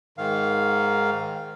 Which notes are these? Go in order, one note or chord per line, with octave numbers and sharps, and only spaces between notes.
G#2 D#3 F5